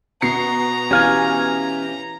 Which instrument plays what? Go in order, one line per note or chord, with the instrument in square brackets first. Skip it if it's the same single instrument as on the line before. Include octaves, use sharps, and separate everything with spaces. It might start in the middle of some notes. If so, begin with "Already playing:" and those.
[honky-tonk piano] B2 C7 C#7 [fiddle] A#5
[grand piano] E3 G4 [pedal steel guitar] C#4 F5 G#5